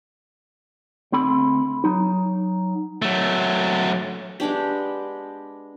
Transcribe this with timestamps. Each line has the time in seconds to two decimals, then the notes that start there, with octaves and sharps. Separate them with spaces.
1.12 D2 C4 A4 B5
1.84 F#3 D#4
3.02 F#3 A3
4.40 G#3 B3 D4 G4